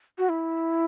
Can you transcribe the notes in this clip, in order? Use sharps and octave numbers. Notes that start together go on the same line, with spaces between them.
F#4
E4